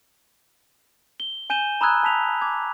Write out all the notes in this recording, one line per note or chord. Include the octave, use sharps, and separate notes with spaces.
G7
G#5 G6 D#7 E7 G7
A#5 B5 D#6 E6 F#6 G#6
A5 B6 F7
D6 G#6